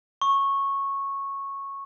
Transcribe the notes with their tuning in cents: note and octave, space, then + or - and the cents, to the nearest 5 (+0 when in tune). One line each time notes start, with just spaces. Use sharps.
C#6 -10